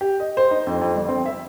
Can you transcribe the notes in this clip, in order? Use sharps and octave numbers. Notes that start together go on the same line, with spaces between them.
G4
D#5
C5
D#4
F2
F2
G1
C4
E5